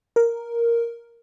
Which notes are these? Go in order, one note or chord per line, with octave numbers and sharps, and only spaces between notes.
A#4